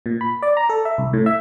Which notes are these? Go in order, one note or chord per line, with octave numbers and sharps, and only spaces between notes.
A#2
B5
D5
A#5
A4
E5
C2
A2
E5